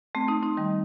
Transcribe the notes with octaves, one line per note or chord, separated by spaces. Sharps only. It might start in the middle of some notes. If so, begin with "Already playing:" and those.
A3 C4
C4 D#4
C4 D#4
D#3 G3